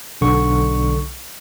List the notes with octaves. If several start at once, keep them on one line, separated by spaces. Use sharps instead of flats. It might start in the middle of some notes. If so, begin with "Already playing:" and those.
B1 D3 C#6